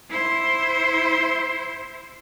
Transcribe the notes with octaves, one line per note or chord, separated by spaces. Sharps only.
E4 C5